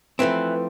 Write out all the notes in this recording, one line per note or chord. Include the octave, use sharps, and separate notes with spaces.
E3 F3 A3 C4